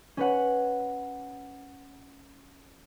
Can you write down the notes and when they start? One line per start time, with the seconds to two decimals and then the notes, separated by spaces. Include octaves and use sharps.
0.17 C#4 B4 F#5